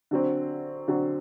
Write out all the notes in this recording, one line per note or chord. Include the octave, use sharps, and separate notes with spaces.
D3 F#3 C4
D3 F#3 C4